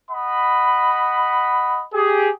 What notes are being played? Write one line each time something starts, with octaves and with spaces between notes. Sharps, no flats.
D#5 F#5 B5
G4 G#4